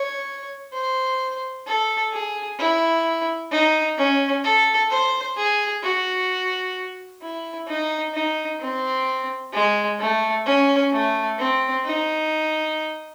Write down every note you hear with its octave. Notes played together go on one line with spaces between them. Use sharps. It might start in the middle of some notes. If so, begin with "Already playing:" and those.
Already playing: C#5
C5
A4
G#4
E4
D#4
C#4
A4
C5
G#4
F#4
E4
D#4
D#4
C4
G#3
A3
C#4
A3
C4
D#4